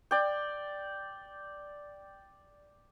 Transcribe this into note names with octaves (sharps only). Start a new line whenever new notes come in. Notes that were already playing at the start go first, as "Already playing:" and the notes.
D5 G5